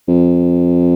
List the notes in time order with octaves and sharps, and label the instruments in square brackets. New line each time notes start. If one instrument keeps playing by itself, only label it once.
[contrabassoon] F2